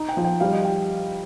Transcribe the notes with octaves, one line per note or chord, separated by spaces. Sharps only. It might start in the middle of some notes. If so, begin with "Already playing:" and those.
Already playing: D#4
G5
F3
G5
G3 F5
D#5
G5